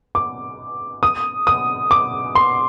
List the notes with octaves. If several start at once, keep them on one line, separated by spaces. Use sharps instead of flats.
D6
D#6
D#6
D6
C6